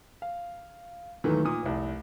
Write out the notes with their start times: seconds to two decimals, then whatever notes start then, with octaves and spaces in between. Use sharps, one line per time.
0.22 F5
1.24 D#2 D#3 E3 F#3 A3
1.45 A#2 D#6
1.63 F1 C2